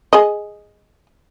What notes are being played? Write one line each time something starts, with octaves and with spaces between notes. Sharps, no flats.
G#4 D#5